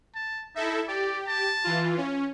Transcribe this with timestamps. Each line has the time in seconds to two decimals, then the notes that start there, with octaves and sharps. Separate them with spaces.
0.15 A5
0.55 D#4 E4 A4 E5
0.88 G4 D5
1.28 A5
1.64 E3 F4
1.98 C#4